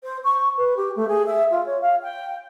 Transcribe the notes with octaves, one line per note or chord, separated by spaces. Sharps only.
C5
C#6
B4
G4
A3
G#4
E5
F4
C#5
F5
G5